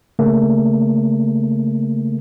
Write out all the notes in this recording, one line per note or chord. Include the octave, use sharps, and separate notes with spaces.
C#3 A3 A#3